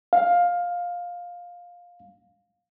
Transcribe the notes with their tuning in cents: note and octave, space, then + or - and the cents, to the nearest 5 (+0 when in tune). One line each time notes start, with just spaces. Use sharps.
F5 +15